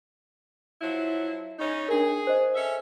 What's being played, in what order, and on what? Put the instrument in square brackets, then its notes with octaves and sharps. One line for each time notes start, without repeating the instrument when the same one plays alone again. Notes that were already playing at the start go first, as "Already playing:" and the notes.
[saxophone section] F3 F#3 E4
C#3 C#4 D#4
[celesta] D4 A#4 [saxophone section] G#4
[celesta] C5 D#5
[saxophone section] C#4 A4 E5